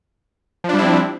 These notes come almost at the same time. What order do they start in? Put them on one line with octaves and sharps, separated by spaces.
F3 D4 G3 E4 C4